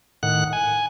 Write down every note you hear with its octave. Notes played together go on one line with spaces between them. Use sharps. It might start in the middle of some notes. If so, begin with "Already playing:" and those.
A2 D#3 F#5 F#6
G#5